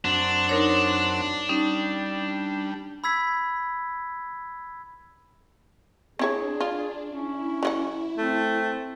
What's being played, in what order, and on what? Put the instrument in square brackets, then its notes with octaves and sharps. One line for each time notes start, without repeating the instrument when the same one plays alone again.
[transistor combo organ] F#2 C4 F#5 [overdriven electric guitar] D4
[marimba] D#4 A#4 C#5
[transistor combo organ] G3 [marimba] C#4 D#4
[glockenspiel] B5 E6 G#6 B6
[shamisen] C4 E4 C#5 [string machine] D4 [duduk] G#4
[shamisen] F4
[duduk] C#4 [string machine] E4
[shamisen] F#3 F4 F#5
[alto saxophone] A3 [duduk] C4